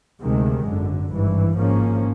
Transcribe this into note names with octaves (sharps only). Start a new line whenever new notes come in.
D2 C3 D#3 G#3
G#1 F#2 D3
G#1 G2 E3
G#1 G#2 F3 A#3 C#4